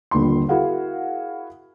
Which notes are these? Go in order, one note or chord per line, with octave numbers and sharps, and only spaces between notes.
D#1 A#1 D3 B5 C6
E4 F#4 G#4 A#4 F5 F#5